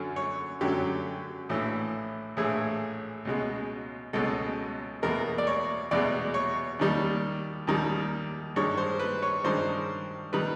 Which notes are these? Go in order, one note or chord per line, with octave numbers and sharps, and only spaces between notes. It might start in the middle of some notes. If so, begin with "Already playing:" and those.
Already playing: F#2 D3 F#3
C#5
F#2 D3 F#3 G4
A#1 A2 E3
A#1 A2 E3 G#4
C#2 B2 G#3
C#2 B2 G#3 A4
E2 B2 G#3 A#4
D5
C#5
E2 B2 G#3 D5
C#5
D#2 D#3 G3
D#2 D#3 G3
G2 D#3 G#3 C#5
C5
B4
C#5
G2 D#3 G#3 C5
D#3 G3 B4